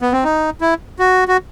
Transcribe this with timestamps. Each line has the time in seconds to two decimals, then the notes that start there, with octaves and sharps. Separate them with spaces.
0.02 B3
0.13 C4
0.24 D#4
0.61 E4
0.99 F#4
1.28 F#4